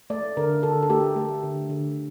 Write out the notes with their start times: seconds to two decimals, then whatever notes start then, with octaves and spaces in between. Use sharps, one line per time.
0.10 A3 D5
0.37 D3 A#4
0.63 D3 A4
0.83 A4
0.90 A3 G4
1.16 A3
1.43 D3
1.70 D3